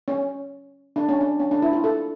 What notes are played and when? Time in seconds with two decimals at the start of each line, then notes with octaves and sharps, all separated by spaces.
0.08 C#4
0.96 D4
1.09 C#4
1.21 D4
1.40 C#4
1.51 D4
1.62 E4
1.73 F4
1.84 A4